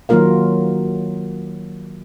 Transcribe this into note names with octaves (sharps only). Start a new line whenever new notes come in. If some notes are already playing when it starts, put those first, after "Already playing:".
D#3 F#3 A#3 F4 A#4 F5